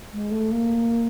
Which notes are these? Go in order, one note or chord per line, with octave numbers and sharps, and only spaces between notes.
G#3
A3
A#3